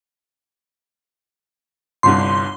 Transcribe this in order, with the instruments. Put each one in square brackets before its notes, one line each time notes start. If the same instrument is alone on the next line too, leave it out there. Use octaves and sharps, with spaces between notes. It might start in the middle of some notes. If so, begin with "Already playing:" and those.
[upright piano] G1 C2 G2 [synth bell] C6